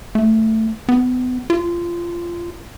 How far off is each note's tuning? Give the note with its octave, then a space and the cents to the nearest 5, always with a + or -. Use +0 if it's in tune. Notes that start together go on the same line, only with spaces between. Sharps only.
A3 +10
B3 +30
F4 -20